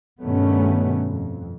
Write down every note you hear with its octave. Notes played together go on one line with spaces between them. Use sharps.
G2 B2 D#3 A3 B3 C#4
F2